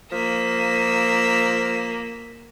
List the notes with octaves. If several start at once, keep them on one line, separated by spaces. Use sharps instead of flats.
F3 A#3 E6 B6